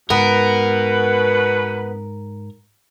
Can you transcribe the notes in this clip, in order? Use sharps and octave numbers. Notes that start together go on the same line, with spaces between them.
G#2 B2 B3 A#4 B4